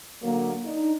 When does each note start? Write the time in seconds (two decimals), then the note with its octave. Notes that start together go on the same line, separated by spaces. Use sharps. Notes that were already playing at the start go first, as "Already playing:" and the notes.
0.23 D3 F#3 A#3
0.65 D4 D#4